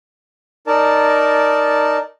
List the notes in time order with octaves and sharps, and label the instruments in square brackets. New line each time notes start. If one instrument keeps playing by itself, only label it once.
[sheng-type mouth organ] D#4 A#4 D5 A5